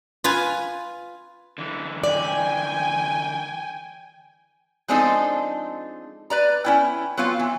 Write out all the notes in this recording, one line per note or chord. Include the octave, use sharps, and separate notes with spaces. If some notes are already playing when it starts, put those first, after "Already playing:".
F4 B4 F5 G#5
D3 E3
D5 G5 G#5
F3 G#3 C4 D4 D#4 A4
B4 D5 A#5
C#4 E4 G5
F#3 B3 C4 F4 F5
E3